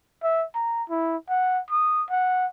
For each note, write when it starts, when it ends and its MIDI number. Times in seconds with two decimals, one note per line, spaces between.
0.23 0.45 76
0.55 0.83 82
0.90 1.16 64
1.29 1.60 78
1.71 2.04 87
2.10 2.47 78